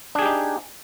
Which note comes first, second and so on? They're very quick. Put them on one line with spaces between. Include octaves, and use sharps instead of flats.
D4 G#4 G4 D#4